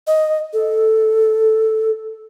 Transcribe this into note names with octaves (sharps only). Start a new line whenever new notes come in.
D#5
A4